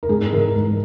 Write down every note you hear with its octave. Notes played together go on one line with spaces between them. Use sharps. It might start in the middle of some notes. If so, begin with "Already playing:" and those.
A#4
G#2 G#4
E3 A#4
G#2